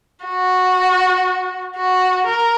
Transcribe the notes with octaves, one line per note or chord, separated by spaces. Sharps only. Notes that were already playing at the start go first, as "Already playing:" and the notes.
F#4
F#4
A#4